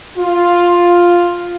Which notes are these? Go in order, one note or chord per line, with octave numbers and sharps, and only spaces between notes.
F4